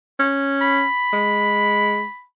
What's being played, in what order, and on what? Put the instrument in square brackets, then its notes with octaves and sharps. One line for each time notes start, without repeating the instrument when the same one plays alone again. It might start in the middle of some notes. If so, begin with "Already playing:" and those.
[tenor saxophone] C#4
[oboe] B5
[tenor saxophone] G#3